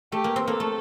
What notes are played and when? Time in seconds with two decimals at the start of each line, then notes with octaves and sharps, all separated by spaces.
0.12 A3 G4
0.24 A#3
0.36 C4
0.48 A#3 A4
0.60 A3